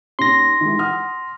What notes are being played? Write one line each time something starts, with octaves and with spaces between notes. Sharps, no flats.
D#2 C#4 C6 A#6
D#3 E3 G#3
F#5 D#6 F6